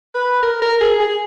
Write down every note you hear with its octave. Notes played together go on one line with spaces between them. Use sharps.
B4
A#4
A#4
G#4
G#4